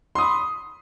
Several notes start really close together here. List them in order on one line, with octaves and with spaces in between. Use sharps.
C6 D#6 B5